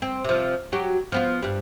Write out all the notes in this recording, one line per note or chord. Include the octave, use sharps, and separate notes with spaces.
C4
C3 F3
F#3 F#4 G4
F3 B3 F4
G2 G3